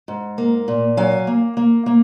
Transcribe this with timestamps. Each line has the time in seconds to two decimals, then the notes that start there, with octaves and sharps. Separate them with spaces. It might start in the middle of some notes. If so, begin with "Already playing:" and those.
0.08 G#2
0.38 A#3
0.68 A#2
0.97 F#3 F5 G#5
1.27 A#3
1.57 A#3
1.86 A#3